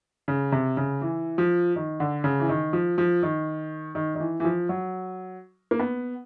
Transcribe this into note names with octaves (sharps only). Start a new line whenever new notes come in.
C#3
C3
C#3
E3
F3
D#3
D3
C#3
E3
D#3
F3
F3
D#3
D#3
D#3
E3
E3
F3
F#3
A#3
B3